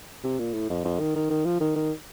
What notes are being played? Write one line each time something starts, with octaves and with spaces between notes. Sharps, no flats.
C3
A#2
A2
F2
F2
D#3
D#3
D#3
F3
D#3
D#3